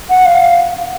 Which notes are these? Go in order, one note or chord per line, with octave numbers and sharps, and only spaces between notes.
F#5
F5
F5